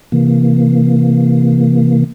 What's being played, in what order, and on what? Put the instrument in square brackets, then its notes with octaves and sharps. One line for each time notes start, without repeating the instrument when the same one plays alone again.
[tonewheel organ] C3 E3 A#3